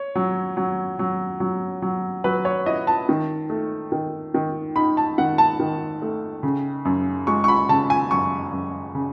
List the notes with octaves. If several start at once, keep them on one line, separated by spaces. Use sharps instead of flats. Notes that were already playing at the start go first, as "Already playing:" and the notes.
Already playing: C#5
F#3
F#3
F#3
F#3
F#3
F#3 B4
C#5
E4 D#5
A5
D#3
A3
D#3
D#3
D#4 B5
A5
D#3 F#5
A5
D#3
A3
C#3
F#2
G#3 C#6
C#6
B5
C#3 A5
G#5
F#2 C#6
F#2
C#3